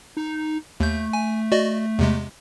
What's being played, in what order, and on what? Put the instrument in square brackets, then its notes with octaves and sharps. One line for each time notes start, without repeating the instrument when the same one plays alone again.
[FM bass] D#4
[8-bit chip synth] D#2 G6 [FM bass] A3
[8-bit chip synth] G#5
F#4 D5 D#5
E2 C3 G#3